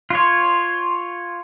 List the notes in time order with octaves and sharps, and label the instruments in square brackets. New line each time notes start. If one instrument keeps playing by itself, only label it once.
[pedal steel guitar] F4 C#5 [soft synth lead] C6